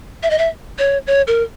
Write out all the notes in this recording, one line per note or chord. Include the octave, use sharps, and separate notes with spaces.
E5
D#5
E5
C#5
C#5
A#4